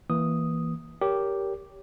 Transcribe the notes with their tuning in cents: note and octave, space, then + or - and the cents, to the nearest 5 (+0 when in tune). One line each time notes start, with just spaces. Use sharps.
E3 -5 A#3 +0 D#6 +0
G4 +0 A#4 +0 C#5 +25